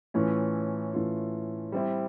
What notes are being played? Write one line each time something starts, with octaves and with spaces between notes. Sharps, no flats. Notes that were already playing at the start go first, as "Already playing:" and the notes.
A2 E3 A3 C#4 F4
A2 E3 A3 C#4 F4
G3 C4 E4